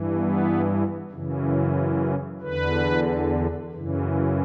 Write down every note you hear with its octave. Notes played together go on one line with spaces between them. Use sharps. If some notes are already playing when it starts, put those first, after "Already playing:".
Already playing: G2 E3
B3
F#2 C#3 E3
E2 D3 B4
F#2 C#3 E3